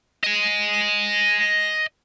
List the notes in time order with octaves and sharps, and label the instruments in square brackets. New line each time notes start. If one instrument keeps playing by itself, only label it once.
[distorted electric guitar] D#5 G#5